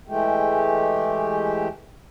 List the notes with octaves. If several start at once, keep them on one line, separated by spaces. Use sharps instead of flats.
E3 G#3 A3 G4